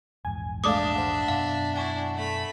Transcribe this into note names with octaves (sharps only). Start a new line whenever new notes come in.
A#1 E2 G#2 G#5
G#3 A3 D4 D5 E5 F5 D6 D#6
C5 F#5
F#2 B2 B3 F5
D4 E4 F#5 G#5 C#6
A3 B5